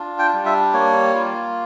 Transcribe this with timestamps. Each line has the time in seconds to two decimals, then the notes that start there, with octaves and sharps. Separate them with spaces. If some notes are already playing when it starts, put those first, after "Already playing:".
Already playing: D4 F4
0.19 G5
0.33 G3
0.46 E5
0.73 A#3 C#5
1.14 F4